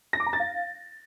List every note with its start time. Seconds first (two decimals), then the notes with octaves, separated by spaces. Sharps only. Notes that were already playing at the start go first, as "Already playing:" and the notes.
0.13 A#6
0.20 D6
0.26 A#5
0.33 A6
0.40 F5